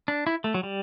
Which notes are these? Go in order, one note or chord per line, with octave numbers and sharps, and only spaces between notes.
D4
E4
A3
F#3
G3